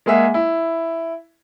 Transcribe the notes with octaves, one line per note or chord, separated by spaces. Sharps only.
G#3 A#3 G#4 E5 F#5
E4